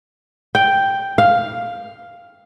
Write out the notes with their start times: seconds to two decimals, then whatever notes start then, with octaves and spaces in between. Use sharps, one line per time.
0.55 G5
1.18 F5